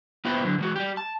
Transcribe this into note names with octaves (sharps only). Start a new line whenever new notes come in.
B3 E4 F4 G4 B4 C5
D3 F#3
E3 G#3 F#4
G3 G4
A5